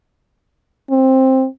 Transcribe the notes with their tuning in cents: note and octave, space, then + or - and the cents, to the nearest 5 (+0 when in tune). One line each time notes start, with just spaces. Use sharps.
C4 +10